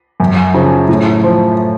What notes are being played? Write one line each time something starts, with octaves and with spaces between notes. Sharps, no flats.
F#2
C#3 F3
A2
F3